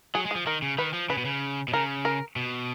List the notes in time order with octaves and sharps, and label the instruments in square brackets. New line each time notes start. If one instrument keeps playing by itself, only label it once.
[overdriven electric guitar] F#3 [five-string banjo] G#4
[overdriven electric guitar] G#3
[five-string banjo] G#4
[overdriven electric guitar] F3
[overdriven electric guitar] D#3 [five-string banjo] A#4
[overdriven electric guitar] C#3
[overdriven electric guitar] D#3 [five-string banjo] B4
[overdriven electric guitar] F3
[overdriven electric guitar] C#3 [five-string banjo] B4
[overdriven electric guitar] B2
C#3
B2
[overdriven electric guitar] C#3 [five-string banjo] A#4
[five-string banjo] A#4
[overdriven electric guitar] B2